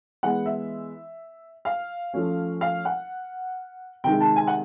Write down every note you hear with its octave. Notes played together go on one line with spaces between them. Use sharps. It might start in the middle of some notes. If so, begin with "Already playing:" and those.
E3 G#3 B3 F#5
E5
F5
F3 A3 C#4
F5
F#5
C3 D#3 G#3 G5
A5
G#5
F#5